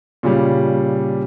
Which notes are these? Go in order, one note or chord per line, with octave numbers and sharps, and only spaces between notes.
A#2 C#3 G3